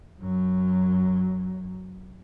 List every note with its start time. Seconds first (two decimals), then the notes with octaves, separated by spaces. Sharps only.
0.20 F#2 F#3